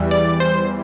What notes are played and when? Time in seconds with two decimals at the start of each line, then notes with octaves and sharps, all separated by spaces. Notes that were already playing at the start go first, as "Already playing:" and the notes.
Already playing: E2 E3 G3
0.11 D5
0.40 C5